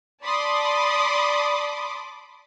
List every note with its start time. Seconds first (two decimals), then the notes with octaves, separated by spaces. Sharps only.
0.23 D5 A5 B5 C6 D6 D#6